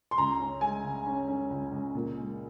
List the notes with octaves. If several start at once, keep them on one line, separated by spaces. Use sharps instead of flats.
C6
C#2 A#5
C#4
G#3 G#5
C#3
C#4
C#4
C#2
C#2
A#2
G#3